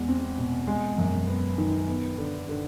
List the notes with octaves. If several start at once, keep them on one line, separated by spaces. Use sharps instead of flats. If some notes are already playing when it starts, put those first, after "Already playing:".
Already playing: E2 G#3
C4
B2
G#3
F#2
B3
D#3
B3
D3
D3